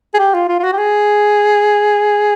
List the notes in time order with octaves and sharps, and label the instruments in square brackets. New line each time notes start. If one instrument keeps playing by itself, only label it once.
[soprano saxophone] G#4
G4
F4
F4
F4
F#4
G4
G#4